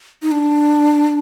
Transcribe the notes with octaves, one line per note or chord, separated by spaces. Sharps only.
D#4
D4